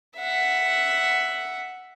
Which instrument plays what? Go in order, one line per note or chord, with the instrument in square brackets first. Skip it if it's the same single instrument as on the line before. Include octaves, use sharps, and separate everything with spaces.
[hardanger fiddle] E5 F#5